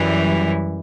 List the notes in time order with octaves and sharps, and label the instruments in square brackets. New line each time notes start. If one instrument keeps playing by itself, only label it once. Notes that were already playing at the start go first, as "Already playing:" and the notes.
Already playing: [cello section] F#2 E3 G3